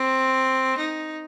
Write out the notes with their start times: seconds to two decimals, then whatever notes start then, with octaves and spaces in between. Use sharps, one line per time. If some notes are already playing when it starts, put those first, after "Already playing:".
Already playing: C4
0.78 D#4